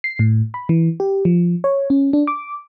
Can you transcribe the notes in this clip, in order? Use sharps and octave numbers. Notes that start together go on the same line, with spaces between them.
C7
A2
B5
E3
G4
F3
C#5
C#4
D4
D6